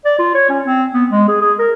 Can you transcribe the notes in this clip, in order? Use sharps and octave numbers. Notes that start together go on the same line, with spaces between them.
D5
F4
C#5
C#4
C4
B3
G#3
G#4
G#4
A#4